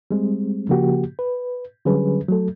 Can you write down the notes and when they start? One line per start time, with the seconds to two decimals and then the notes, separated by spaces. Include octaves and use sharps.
0.11 G3 G#3 C4
0.69 C#3 F3 A#3 F#4 G4
1.19 B4
1.85 D3 F#3 G3 C#4 G#4 B4
2.28 F#3 A3 A4